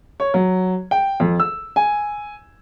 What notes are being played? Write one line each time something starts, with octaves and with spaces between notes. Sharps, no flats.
C#5
F#3
G5
F2
E6
G#5